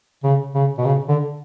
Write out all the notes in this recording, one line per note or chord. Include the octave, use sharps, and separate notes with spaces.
C#3
C#3
B2
C#3
D3